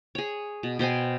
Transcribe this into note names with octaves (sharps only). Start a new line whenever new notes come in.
G#4 C#5
B2
B2 C5 G5 G#5